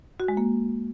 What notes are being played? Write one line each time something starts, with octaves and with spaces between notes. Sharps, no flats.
F#4
G#3
A#3